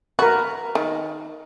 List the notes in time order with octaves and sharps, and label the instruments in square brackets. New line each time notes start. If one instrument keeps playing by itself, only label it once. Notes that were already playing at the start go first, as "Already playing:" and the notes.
[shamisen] F#4 [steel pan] A#4 B4
[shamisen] D#3